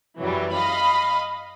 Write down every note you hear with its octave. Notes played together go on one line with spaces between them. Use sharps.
F#2 E3 F#3 G3
D#5 F5 B5